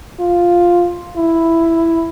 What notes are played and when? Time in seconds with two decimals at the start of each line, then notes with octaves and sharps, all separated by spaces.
0.20 F4
1.17 E4